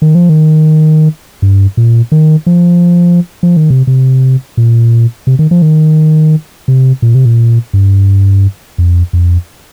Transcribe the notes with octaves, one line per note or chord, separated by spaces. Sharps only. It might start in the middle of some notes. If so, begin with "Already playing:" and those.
D#3
F3
D#3
G2
A#2
D#3
F3
F3
D#3
C3
C3
A#2
C3
D#3
F3
D#3
C3
A#2
C3
A#2
G2
F2
F2